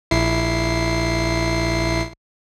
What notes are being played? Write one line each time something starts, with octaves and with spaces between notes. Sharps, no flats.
A#1 E4 C7